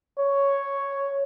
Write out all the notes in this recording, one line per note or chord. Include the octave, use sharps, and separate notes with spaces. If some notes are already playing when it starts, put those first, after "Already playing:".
C#5